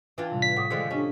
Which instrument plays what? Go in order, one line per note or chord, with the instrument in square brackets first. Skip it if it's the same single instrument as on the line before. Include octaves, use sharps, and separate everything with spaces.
[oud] E3 D4 F4
[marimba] A2 C3 G3
[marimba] D5 [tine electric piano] B6
[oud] A2 [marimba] F#5 D6 D#6
[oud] D3 F3 G#3 [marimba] D#3 D#6
[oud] A3 C#4 [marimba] D4 G4 D#5